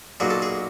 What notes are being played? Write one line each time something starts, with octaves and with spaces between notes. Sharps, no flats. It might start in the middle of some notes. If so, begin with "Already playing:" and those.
B1 A#2 F#3 G#4
A4
G#4